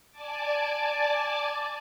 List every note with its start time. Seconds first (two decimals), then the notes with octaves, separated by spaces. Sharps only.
0.11 D5 G#5 A5 D6